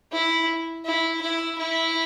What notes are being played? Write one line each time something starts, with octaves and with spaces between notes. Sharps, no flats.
E4
E4
E4
E4